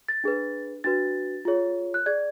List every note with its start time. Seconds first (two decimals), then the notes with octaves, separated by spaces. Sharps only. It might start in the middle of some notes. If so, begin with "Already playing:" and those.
0.08 A6
0.24 D4 G#4 B4
0.84 D4 F#4 B4 A6
1.45 F4 G#4 C#5
1.94 F#6
2.06 G#4 D5 G#6